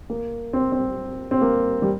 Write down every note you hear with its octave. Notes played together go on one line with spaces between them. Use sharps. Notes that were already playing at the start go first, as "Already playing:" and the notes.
A#3
C4
C4
C4
A#3
G3